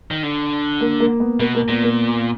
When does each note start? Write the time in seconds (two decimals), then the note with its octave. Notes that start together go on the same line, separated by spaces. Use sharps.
0.11 D#3
0.23 D3
0.81 A#3
1.00 A#3
1.20 B3
1.40 B2 A#3
1.55 A#3
1.68 A#2 B3
1.83 A#3